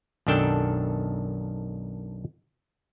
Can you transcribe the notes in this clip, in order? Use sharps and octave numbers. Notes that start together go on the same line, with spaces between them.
B1 F#2 D#3 D4 A4 G5